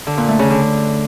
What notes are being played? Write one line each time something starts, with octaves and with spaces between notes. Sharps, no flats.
D3
A#2
A3
C#3
D3